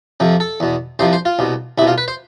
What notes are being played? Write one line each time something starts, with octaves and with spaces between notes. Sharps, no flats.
F2 C3 F3
A4
E2 B2
C2 C3 F3 C5
C5
F4
C2 B2
C2 B2 E4
F4
B4
C5